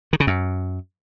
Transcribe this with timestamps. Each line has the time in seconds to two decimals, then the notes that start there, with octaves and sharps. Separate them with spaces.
0.13 D#3
0.20 C#3
0.27 F#2